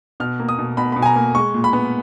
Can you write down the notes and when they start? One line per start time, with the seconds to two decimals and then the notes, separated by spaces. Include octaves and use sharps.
0.20 B2 F6
0.40 A#3
0.49 D#6
0.59 B2
0.77 B2 B5
0.92 B2 B5
1.02 G#5
1.06 A#5
1.16 A#3
1.35 G#3 C#6
1.54 A#2
1.64 B5
1.73 B3